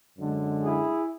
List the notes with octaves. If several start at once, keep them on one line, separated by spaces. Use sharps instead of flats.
F#2 D3 G#3
E4 G#4